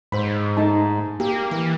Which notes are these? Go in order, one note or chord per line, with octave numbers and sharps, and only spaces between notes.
G#2 C5 B5
A3 D#4 A5
A#3 G4
E3